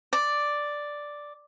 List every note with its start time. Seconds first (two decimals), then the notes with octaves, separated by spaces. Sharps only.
0.13 D5